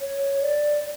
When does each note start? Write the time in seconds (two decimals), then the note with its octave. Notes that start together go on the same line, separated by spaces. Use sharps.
0.01 C#5
0.42 D5